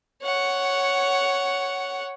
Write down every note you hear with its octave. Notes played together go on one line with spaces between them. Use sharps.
C#5 F#5